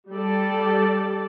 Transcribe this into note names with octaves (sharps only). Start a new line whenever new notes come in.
G3 G4 A4 D5